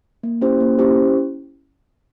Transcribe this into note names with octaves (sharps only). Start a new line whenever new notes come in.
A#3
C#4 E4 G4 C5
A#3
C#4 E4 G4 C5